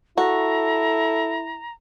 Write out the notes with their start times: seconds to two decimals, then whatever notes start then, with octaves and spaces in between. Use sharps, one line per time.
0.18 E4 F#4 A4 A#5